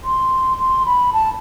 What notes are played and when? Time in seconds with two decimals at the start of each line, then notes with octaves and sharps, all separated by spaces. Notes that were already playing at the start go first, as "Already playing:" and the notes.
0.04 C6
0.59 C6
0.86 B5
1.13 A5